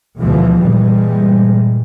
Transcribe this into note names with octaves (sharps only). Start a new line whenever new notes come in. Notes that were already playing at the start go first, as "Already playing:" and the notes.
D2 B2 E3 F3 G#3
G2 A#2 E3 G3 G#3